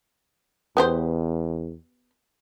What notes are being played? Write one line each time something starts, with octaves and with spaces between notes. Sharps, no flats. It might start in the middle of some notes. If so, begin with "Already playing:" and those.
E2 B3 G4 C5